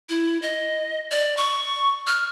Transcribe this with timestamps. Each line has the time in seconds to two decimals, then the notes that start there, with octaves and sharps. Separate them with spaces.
0.09 E4
0.42 D#5
1.11 D5
1.37 C#6
2.07 F6